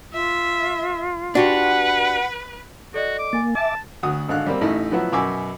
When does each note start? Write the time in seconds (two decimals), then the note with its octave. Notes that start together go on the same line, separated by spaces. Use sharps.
0.13 F4 E5
1.35 D4 F#4 G4 B4 F#5
2.94 F#4 A4 D5 D#5
3.18 D6
3.33 A#3 G#5 A6
3.55 E5 A5 D6
4.03 D2 F#4 D#6
4.28 G#1 D3 F5 F#6
4.47 G3 A#3 C4
4.61 A1 A3 D#4 E4
4.91 F3 F#3 B3 E4 F#4
5.13 F#2 B2 G#5 D6 E6